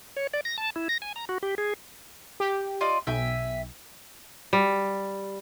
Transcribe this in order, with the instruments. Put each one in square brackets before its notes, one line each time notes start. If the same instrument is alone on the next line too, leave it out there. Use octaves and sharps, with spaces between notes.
[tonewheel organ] C#5
D5
A#6
A5
E4
A#6
G#5
A#5
F#4
G4
G#4
[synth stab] G4
[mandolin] F4 D5 D#5
[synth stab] B1 [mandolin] E5 G5 G#5
[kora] G3